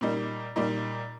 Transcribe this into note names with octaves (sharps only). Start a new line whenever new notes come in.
A#2 G3 A#3 D#4
A#2 G3 A#3 D#4